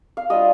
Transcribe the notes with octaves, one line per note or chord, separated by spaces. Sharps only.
F5
G3 D4 F4 D#5